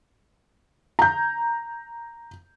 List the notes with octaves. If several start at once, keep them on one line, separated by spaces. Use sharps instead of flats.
A#5 G6